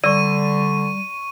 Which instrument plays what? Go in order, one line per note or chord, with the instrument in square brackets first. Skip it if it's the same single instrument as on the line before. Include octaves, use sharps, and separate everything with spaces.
[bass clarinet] D3 [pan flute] G3 [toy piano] D5 E6 [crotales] C#6 D#7